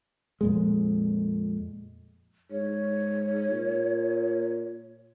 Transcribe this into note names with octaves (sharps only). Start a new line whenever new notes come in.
F2 A#2 G#3
G#2 C#5
A#2